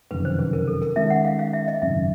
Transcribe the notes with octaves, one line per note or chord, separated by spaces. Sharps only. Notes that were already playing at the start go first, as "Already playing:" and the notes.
F#1 F2 C3 D#3 B4
C5
B4
A#4
A4
A#4
D#3 G#3 C#4 E5
F#5
F5
F5
E5
D#5
G#1 F#2 C#3 E5